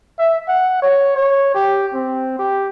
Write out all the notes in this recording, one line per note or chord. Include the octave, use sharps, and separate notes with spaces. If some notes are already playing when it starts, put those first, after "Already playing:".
E5
F#5
C#5
C#5
G4
C4
G4